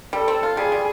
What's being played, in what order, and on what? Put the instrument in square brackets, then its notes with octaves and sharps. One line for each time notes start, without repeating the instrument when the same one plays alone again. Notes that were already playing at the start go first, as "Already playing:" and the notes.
[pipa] G3 [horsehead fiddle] A4
[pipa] C4
F4
[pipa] G3 [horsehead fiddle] G#4
[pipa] G3